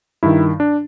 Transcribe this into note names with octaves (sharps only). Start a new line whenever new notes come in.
G2 D#3 E4
D4